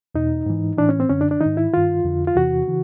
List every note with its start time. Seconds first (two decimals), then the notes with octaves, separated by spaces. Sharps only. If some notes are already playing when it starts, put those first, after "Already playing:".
0.15 E2 B2 D#4
0.46 G#2 E3
0.78 A2 E3 D4
0.89 C#4
1.00 C4
1.09 F#2 D3 C#4
1.21 D4
1.31 D4
1.41 G#2 D#3 D#4
1.57 E4
1.74 G2 D#3 F4
2.04 F2 D3
2.27 F4
2.36 E2 C3 E3 F#4
2.68 C#3 E3